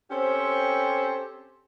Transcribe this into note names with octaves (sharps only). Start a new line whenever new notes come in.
C4 C#4 G4 A4 C5